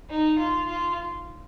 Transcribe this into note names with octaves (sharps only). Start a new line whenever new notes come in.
D#4
F4
F4